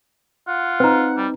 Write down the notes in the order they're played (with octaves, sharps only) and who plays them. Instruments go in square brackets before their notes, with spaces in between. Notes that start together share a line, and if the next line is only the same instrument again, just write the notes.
[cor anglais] F4 [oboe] F#5
[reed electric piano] C4 D#4 [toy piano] B4 A#5
[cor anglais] G3